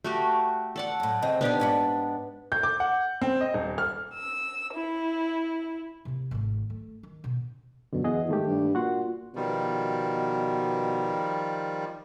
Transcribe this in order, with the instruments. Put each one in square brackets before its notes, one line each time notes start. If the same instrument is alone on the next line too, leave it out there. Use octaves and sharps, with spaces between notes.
[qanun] A3 F#4 G4
A4 D5 F#5
[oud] F#2 A2
C#3 C4 D#5
[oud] A#2 D#4 [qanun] B3 D4 G4
[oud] G#2 C#5 D5
[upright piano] G6
D6
F#5
C4
D#5
D#1
F6
[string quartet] E6
E4
[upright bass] C3 A#3
G#1 A3
A3
D#3
B2
[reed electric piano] F#2 D3 [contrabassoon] B2
[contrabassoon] E2 [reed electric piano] G#4 D#5 F#5
[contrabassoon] G#2 [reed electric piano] D#3 A3 G4
[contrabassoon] G2
[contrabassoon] A#2 [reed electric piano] F#4 F#5 C6
[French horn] B2 [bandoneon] D#3 F3 G3